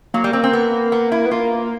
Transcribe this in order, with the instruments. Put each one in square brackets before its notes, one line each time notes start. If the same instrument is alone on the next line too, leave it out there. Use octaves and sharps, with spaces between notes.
[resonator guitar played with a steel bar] F#3 [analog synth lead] A#3
[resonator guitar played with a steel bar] G3
C4
C4
B3
B3
E4
[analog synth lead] B3
[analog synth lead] A#3 [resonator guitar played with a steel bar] F4